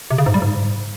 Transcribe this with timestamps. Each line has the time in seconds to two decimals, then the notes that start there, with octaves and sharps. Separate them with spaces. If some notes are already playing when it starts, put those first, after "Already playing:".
0.10 C3
0.18 C#3
0.26 G#2
0.34 G3
0.42 G#2